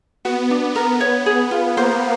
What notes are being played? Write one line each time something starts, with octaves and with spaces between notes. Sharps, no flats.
B3 F#4
D4
B3 A#4
C#5
G#4
F4
A#3 C5